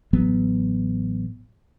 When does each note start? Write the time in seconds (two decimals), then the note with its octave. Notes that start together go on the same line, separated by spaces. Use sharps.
0.13 A1 A2 F#3 B3